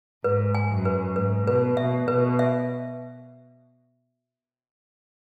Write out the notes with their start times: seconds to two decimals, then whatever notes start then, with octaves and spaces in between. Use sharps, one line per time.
0.24 G#2 B4
0.55 G#5
0.70 F#2
0.85 B4
1.16 G#2 B4
1.47 B2 B4
1.77 B2 E5
2.08 B2 B4
2.39 E5